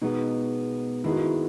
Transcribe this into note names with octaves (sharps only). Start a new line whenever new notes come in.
B2 G#3 B3 D#4
D#3 G#3 B3 E4
F#4
E4